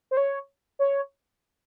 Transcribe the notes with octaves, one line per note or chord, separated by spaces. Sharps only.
C5
C#5
C#5